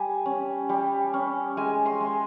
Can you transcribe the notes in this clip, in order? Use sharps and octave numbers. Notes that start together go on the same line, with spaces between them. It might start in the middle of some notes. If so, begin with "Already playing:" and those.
Already playing: G3 G#5
C#4
G3
C#4
G#3 G#5
C6
G#3